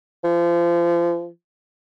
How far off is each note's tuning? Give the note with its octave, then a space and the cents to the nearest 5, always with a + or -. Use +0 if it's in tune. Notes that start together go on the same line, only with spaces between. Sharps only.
F3 -30